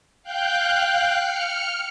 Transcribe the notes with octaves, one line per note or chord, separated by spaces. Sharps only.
F5 G5 F#6 G6
F6 C#7